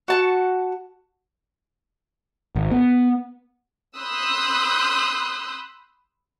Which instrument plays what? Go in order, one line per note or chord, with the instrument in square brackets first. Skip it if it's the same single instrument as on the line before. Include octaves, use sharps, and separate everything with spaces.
[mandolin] F#4 A5 C#6
[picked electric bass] G#1
B3
[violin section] B5 C6 D#6 E6 F#6 G6